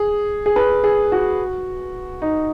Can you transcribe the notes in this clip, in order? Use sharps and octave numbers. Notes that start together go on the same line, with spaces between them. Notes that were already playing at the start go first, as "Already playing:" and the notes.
Already playing: G#4
G#4
B4
G#4
F#4
D#4